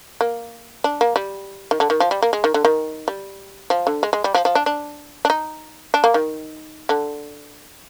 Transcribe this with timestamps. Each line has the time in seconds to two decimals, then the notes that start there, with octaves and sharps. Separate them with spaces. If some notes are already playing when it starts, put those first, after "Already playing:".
0.21 A#3
0.84 D4
1.01 A#3
1.16 G3
1.71 D#3
1.80 D3
1.90 D#3
2.00 F3
2.11 G3
2.22 A#3
2.33 G#3
2.44 D#3
2.54 D3
2.65 D#3
3.08 G3
3.70 F3
3.87 D3
4.03 G#3
4.13 G#3
4.24 G3
4.34 F3
4.45 F3
4.55 D4
4.66 D4
5.25 D4
5.30 D#4
5.94 D4
6.04 A#3
6.14 D#3
6.89 D3